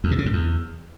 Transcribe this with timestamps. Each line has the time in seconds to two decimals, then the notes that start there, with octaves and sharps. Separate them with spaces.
0.04 E2
0.11 A#2
0.18 C#3
0.26 G#2
0.33 E2